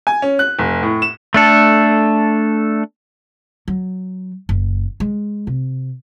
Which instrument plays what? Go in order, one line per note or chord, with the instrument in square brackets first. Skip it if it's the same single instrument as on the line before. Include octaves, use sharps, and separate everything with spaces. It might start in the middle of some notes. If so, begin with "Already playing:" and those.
[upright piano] G#5
C#4
F#6
F1
A2
E7
[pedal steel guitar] A3 D4 A4
[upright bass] F#3
F#1
G#3
C3